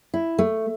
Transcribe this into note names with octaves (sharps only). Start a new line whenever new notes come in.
E4
A3